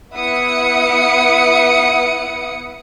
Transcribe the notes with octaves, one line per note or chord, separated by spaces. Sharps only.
B3 E4 E5 F#5 D#6 C#7